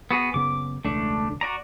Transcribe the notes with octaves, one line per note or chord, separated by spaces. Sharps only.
B3 F#4 G#4
F#1 C#3 B3 D6
E1 C#2 A3 D4
F#4 D5 A#5